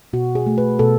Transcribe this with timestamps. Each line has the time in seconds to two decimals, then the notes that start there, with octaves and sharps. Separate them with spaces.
0.13 B2 F#4
0.35 G#4
0.47 A3
0.58 B4
0.79 B2 A4